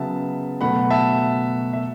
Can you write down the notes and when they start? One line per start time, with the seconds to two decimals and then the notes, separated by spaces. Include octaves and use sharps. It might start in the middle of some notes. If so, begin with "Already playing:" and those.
Already playing: C#3 F#3 B3 E5 A5
0.61 B2 F#3 A3 F#5 B5
0.90 E5 A5
1.73 E5